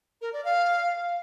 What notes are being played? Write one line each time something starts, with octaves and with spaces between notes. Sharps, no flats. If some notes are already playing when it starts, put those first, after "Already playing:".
A#4
D5
F5